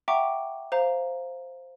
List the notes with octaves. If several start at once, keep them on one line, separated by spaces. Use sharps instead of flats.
E5 F#5 G5 A#5 C#6 D6
C5 F5 A#5